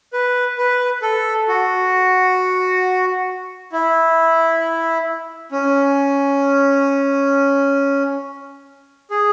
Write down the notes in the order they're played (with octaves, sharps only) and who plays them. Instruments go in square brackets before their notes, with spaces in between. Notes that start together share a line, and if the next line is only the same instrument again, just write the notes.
[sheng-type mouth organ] B4
B4
A4
F#4
E4
C#4
G#4